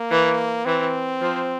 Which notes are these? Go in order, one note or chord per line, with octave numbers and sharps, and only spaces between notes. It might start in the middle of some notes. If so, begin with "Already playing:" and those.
Already playing: A#3
E3
E3 C4
F3